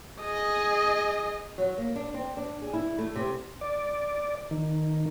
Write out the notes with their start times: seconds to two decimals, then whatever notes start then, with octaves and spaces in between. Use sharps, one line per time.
0.22 G#4 D#5
1.58 F#3
1.78 A#3
1.96 D4
2.14 C4
2.37 D4
2.62 G#4
2.73 E4
2.99 A3
3.15 C3
3.61 D5
4.51 D#3